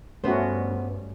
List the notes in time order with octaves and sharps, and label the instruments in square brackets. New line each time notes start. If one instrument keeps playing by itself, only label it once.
[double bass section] G2 [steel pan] A3 C#4 F#4 [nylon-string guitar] B3 C5